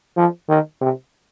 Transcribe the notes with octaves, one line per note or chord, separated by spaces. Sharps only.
F3
D#3
C3